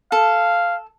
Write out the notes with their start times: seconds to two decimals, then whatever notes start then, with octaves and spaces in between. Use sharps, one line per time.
0.12 A4 F5